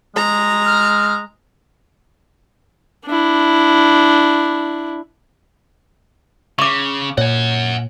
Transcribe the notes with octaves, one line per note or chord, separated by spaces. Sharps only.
G#3 A#5
F6
D4 E4
C#3 C#6 D6
A#2 C#5 F#5 G#5